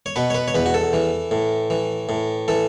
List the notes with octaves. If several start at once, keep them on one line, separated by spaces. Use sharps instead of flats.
C#5
B2 B4
C#5
B4
C#5
E2 B4
F#4
A4
E3
A2
E3
A2
E3 A4